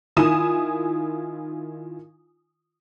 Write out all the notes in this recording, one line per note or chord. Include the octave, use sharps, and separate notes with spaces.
D#3 E4 F4 G#5 D#6 E7